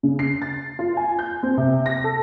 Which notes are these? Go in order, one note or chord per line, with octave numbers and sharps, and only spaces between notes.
C#3
C7
A6
F4
G#5
G6
C4
C3
A#6
A4